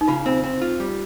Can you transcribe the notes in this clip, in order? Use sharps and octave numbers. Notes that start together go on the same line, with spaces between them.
D#4
C#3 F4
C4
C4
F4
G3